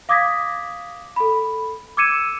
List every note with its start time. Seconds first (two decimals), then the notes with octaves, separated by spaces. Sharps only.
0.09 F5 D6 D#6 G#6 A#6 B6
1.16 A4 B5
1.97 D6 E6 G#6 C#7 D#7 E7